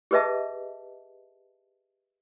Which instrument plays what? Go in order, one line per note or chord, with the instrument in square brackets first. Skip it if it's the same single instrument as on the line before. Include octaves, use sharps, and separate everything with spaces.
[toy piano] G4 G#4 B4 D#5 E5 A5